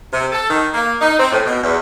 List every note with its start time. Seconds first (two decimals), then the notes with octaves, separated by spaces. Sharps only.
0.12 C3
0.32 A4
0.50 D#3
0.74 A#3
1.01 D#4
1.18 C4
1.32 A2
1.45 B2
1.63 E2